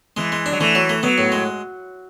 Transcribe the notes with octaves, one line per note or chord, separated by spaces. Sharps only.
E3 G#3
G#3
D4
F#3
E3 A3
F#3
A3
F#3 B3
A2
G#3